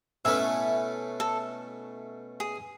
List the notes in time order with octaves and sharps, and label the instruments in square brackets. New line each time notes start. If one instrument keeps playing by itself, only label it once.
[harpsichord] B2 A3 C#4 E4 B4 [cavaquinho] E5 G#5
[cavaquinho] A4
G#4